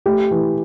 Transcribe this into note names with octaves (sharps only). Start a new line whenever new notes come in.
A3 G4
E3